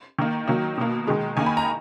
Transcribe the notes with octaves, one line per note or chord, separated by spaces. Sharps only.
D#3 A#3
D#3 F#3 A#3
B2 A#3
D#3 G#3
D#3 A#3 G#5
B5
A#5